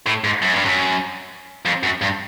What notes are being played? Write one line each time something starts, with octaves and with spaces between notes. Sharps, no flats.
A2
G#2
F#2
G2
F#2
F2
F#2
G2